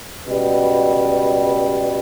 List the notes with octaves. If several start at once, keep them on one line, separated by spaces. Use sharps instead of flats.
C#2 B2 G3